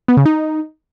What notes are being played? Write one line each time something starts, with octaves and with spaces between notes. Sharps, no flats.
B3
C#3
D#4